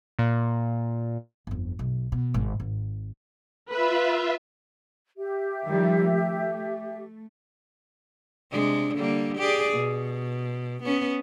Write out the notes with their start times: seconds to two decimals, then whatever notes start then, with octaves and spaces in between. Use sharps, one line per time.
0.19 A#2
1.47 G1 F2
1.79 B1
2.12 B2
2.34 G#1 G#2
2.60 G#1
3.71 F4 B4 E5
5.19 G4 E5
5.67 D#3 F3 G3
6.11 A3
8.51 C3 G#3 D4
8.95 D3 G3 A#3
9.38 G4 G#4 D5
9.73 B2
10.84 B3 C#4